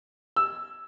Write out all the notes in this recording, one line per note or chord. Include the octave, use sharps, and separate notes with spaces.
E6